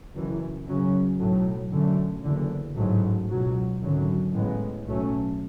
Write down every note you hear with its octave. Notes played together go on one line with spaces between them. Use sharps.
F#1 F#2 E3
F#2 C#3 F#3 C#4
B1 A2 F#3 A3
F#2 D3 A3
F#1 E2 D3
A1 G#2 F#3 A3
C#2 B2 F#3
G#1 F#2 D3 F#3
A1 A2 G#3 B3
B1 A2 F#3 A3 C#4